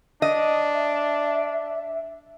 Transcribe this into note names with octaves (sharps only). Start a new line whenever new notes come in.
D4 D#5
E5